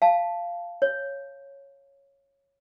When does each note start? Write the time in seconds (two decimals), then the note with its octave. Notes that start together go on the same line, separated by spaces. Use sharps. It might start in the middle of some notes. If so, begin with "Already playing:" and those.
0.02 F5 A5
0.82 C#5